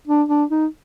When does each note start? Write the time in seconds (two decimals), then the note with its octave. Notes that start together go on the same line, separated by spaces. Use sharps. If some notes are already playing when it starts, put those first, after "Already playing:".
0.08 D4
0.29 D4
0.51 D#4